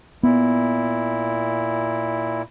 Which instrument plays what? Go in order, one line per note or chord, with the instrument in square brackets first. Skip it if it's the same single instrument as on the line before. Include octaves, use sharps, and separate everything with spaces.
[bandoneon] A#2 E4 [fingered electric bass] B3